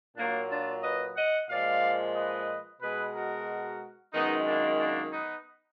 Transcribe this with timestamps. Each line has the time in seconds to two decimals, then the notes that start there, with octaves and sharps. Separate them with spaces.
0.17 A#2 F#3 A#3 D4
0.50 D4 F4
0.83 B4 D#5
1.16 D#5 F#5
1.49 A#2 F3 G#3 D5 F5
2.15 B4 D#5
2.81 B2 G#3 G#4 B4
3.14 F#4 A#4
4.13 F#2 D#3 G#3 B3 D#4
4.47 A#3 D4
4.79 A#3 D4
5.13 B3 D#4